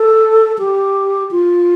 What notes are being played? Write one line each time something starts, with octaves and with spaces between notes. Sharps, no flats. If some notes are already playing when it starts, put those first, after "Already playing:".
Already playing: A4
G4
F4